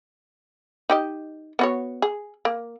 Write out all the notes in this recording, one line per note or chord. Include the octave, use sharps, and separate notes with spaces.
D#4 G4 D#5
B3 F#4 C#5
G#4
A#3